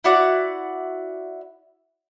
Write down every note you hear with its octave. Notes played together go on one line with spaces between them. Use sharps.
E4 F#4 D5